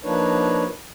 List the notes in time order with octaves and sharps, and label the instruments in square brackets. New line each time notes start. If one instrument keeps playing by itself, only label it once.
[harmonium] F3 A#3 D4 D#4 B4 C#5